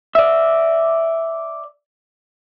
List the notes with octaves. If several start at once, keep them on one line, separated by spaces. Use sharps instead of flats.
D5 E5